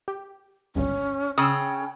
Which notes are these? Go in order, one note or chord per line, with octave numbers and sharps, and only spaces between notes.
G4
G1 C#2 G2 C#4
C#3 G5 D#6 E6